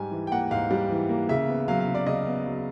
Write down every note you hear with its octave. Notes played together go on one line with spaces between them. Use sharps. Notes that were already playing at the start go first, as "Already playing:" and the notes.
Already playing: G#2 G3 G#5
E3
G5
A#3 F#5
G#2 F5
G3
E3
A#3
C#3 E5
B3
F#3 F5
F5
C#3
D5
C#3 D#5
B3
F#3